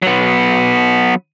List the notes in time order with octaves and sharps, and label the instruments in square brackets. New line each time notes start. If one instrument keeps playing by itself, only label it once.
[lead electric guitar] F#3 B3